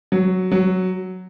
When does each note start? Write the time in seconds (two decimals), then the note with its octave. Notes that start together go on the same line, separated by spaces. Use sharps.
0.12 F#3
0.52 F#3